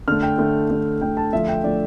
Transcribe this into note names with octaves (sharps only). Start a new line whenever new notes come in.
D3 A3 F6
G5
D3 A3
D3 A3
D3 A3 G5
A5
D3 F3 A3 E5
G5
D3 F3 A3 D5